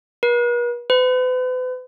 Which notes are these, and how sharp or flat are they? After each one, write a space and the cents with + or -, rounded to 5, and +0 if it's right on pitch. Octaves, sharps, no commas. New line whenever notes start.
B4 -45
B4 +40